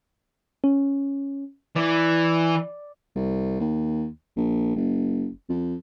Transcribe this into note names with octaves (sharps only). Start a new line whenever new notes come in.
C#4
E3 D5
C2
D#2
A#1
F#1
F2